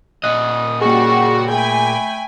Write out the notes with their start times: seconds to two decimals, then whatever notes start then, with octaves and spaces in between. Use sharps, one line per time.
0.24 A#2 D#5 D#6 F#6
0.81 C#3 G3 A#3 F#4 G#4 C#6
1.51 A3 G5 G#5 B5